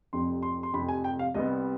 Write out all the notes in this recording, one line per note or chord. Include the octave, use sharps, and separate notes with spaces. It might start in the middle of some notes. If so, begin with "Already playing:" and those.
F1 F2 C3 C6
C6
C6
F1 F2 C3 B5
G#5
G5
F5
C2 C3 G3 B3 D#5